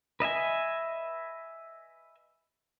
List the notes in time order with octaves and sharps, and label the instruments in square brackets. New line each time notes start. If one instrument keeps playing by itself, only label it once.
[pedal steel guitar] B4 D#5 E5 G#5